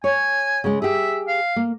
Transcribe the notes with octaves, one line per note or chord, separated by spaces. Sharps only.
C#5 G#5
C#3 G#3
G4 G#4 E5
F5
A#3